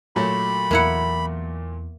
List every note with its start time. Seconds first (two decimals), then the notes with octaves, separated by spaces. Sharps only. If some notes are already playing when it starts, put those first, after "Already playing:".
0.16 A#2 F#3 A3 B5
0.71 E2 A#3 E4 F#5